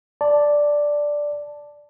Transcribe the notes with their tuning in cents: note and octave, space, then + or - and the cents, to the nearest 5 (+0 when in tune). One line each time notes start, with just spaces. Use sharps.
D5 +0 A5 +0